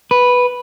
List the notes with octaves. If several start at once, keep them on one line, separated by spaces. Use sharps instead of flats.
B4